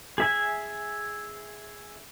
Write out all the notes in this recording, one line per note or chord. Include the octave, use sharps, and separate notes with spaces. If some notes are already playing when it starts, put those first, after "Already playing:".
G#4 E5 G#5